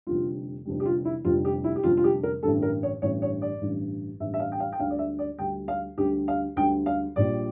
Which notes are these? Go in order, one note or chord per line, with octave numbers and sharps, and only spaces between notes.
F1 F2 D3 G3 F4
F1 F2 D3 G3
G4
F4
E4
F1 F2 D3 G3 F4
G4
E4
G4
F1 F2 D3 G3 F4
F4
G4
A#4
A1 G2 D3 G3 A4
A#4
C#5
A1 G2 D3 G3 C#5
C#5
D5
A1 G2 D3 G3
A1 G2 D3 G3 E5
E5
F5
G5
F5
G5
D2 D3 G3 F5
D5
E5
D5
D2 D3 G3 G5
F5
D2 D3 G3 G4
F5
D2 D3 G3 G5
F5
A#1 A#2 G3 D5